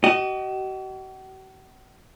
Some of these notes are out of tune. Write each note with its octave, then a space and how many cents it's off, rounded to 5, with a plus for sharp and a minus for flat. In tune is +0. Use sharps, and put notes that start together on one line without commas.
F#4 +45 D#5 -10